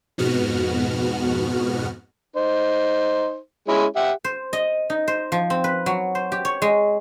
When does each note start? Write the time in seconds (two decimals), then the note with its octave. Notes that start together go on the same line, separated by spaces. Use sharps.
0.18 F2 G#2 B2 B3 F#4 F6
2.36 D#4 C5
3.68 G#3 C#4 E4
3.96 G4 E5 F#5
4.24 C5
4.53 D#5
4.90 D#4
5.08 C5
5.32 F3
5.50 C4
5.64 B4
5.86 F#3
6.15 C5
6.32 G4
6.45 C#5
6.62 G#3